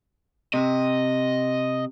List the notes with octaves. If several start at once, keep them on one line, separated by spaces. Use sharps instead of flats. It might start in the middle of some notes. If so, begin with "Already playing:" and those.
C3 D#5